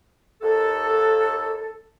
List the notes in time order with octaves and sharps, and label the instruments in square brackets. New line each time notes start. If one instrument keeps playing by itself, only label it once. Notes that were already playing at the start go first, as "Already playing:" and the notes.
[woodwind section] D#2 A4